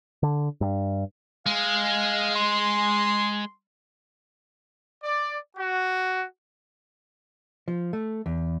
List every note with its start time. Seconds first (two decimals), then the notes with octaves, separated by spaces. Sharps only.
0.23 D3
0.61 G2
1.46 G#3 F5
2.36 C6
5.04 D5
5.57 F#4
7.68 F3
7.93 A3
8.26 E2